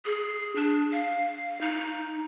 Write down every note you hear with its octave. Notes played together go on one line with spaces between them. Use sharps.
G#4
D4
F5
D#4